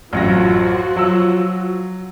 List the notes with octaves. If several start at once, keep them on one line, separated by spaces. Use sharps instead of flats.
A1 F#2 F3 F#4 A#6
F#3 E6